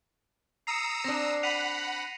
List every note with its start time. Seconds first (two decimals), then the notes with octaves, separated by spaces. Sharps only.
0.67 A#5 D#6 E6 C7 C#7
1.04 C4 D4 A#6
1.43 F#5 B5 B6 D#7 F7